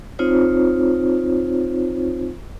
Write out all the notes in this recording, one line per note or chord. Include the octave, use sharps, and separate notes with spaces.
C4 D#4 F4 C5 C#5